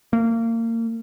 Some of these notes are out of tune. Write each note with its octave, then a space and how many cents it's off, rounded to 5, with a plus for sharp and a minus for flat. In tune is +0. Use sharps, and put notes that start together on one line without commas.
A#3 -30